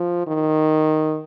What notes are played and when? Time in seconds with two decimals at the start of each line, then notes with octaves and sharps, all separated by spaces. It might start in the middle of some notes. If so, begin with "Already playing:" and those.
Already playing: F3
0.27 D#3